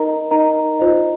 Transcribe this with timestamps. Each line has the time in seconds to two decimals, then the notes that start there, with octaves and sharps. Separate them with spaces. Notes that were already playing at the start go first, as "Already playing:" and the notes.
Already playing: D#4 A#4 D#5 A#5
0.31 D#4 A#4 D#5 A#5
0.79 F4 C5 D#5